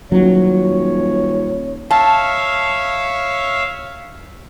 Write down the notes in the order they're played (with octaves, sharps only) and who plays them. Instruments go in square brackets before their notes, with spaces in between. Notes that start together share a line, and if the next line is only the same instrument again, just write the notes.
[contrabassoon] D#1 [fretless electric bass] F#3 [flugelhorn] C#5
[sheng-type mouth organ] C#5 E5 F5 [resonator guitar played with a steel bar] A5